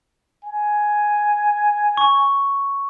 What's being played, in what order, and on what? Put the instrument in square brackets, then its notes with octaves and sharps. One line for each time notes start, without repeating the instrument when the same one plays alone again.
[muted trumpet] G#5
[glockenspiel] C#6